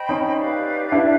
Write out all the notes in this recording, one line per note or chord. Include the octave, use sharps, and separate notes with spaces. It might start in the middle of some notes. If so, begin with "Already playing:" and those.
Already playing: C5 D#5 G5 B5
C#4 D#4
G4 B4 D5 F5
D4 E4